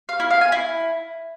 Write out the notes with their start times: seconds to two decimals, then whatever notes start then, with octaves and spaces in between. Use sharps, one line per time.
0.09 F5
0.20 E4
0.30 F5
0.41 G#5
0.52 E4